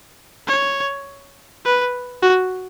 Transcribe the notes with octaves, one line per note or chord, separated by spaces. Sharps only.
C#5
B4
F#4